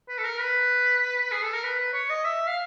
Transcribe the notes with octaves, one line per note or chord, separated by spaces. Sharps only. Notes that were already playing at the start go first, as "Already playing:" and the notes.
B4
A4
A#4
B4
G#4
A4
A#4
B4
B4
C#5
D#5
E5
F5